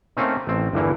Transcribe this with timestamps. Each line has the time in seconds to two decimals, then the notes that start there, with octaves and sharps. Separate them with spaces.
0.17 A3 A#3 C4 C#4 D#4
0.47 A1 C4
0.73 G1 E2 G2 E3 A#3